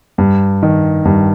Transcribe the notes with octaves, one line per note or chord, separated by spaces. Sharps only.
G2
D#3
G2